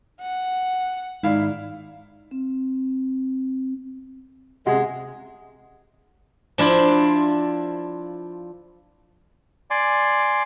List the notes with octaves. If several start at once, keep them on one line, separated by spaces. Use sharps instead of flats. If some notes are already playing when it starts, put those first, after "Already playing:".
F#5
G#2 D#3 G#3 D#4 E4 D5 F5
C4
C3 G#3 F#5
F3 D4 E4 F4
D5 G#5 C6 D6